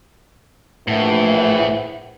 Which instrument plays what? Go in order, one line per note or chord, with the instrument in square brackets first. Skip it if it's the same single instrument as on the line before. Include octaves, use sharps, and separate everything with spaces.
[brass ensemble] A#1 [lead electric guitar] A2 [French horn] E3 [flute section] C5 E5 F#5